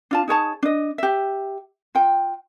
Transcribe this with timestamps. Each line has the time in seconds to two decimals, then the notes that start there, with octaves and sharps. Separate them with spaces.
0.11 D4 F4 A5
0.28 D#4 G#4 C#5 A5
0.63 D4 D#5
0.98 G4 E5
1.95 F4 G5